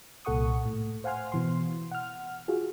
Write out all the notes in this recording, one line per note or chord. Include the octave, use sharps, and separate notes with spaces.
C2 A#2 A4 F#5 C#6 D#6
A2
C5 F5 F#5 G#5 C6 F6
B2 E3 C6
F#5 F6
F4 F#4 G#4